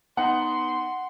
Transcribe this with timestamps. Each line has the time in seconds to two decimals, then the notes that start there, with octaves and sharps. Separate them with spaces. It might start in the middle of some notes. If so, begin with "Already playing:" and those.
0.17 B3 D#4 F#5 C6